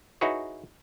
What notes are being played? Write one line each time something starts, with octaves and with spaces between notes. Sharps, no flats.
D#4 E4 F#4 G#4 B4 C#5